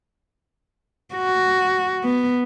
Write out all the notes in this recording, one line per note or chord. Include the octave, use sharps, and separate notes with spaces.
F#4
B3